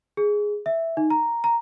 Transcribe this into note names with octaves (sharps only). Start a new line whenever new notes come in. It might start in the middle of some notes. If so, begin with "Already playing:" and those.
G#4
E5
D#4
A#5
A#5